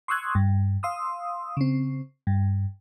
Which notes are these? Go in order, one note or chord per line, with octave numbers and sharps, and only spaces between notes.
C6 C#6 D#6 E6 F#6 G#6
G2
F5 C6 D#6 E6
C#3 C4
G2